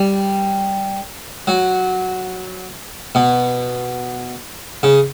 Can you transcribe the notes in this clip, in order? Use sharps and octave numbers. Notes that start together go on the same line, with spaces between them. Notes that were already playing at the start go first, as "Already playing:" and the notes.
Already playing: G3
F#3
B2
C#3